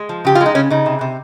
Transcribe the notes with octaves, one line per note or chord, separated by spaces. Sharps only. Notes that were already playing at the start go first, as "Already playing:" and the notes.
Already playing: G#3
F3
C#3 G4
F4
G#3
D#4
C#3 C#4
C#3 D#4
C3
C3